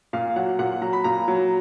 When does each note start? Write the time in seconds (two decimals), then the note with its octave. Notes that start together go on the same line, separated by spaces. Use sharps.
0.13 A#2 F5
0.36 F#3 F#5
0.59 A#2 F#5
0.82 F#3 A#5
0.93 B5
1.04 A#2 A#5
1.28 F#3